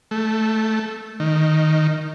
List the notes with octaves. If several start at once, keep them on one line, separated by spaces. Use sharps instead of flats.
A3
D#3